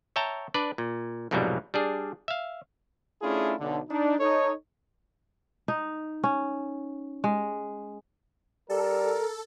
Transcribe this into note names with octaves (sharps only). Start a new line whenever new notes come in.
C#5 E5 G5 A5 A#5
D4 B4 D5
A#2
C2 F2 G#2 B2 F#3 G3
G3 D4 G#4
E5 F5
A3 C#4 D4 E4 F4 G#4
B1 D3
D4 D#4
D#4 A4 C#5
D#4
C#4
G#3
G3 A4 A#4